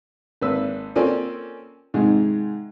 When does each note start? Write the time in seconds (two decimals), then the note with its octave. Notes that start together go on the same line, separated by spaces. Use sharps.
0.42 G#1 A#3 B4 E6
0.95 A#3 C4 C#4 F4 A4 D5
1.94 G#2 C3 D#3 G#3